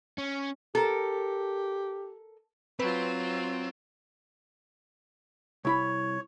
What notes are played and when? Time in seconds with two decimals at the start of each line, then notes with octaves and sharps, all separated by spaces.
0.18 C#4
0.75 G4 A4 A#4
2.80 F#3 C4 F4 B4
5.65 C2 E4 C#5 B5